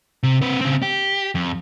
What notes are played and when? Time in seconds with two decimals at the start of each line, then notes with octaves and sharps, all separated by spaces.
0.23 C3
0.42 C4 B4
0.61 C#3 C4
0.82 G4
1.35 F2